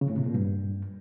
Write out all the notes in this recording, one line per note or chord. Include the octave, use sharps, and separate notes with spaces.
C#3
A2
C3
A#2
G2